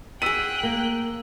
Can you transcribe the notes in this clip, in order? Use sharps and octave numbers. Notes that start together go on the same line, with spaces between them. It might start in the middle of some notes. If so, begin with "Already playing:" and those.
G#4 F#5 G5 E6 F#6 B6 D#7
A#3